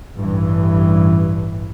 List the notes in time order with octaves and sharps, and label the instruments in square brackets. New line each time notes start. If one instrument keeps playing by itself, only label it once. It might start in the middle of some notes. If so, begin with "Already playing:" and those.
[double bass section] A1 G2 E3